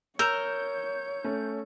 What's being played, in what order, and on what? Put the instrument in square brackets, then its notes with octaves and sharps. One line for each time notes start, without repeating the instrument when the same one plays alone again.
[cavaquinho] A#4 [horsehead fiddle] C#5 [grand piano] E6 E7 [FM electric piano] G6
[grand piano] A3 C#4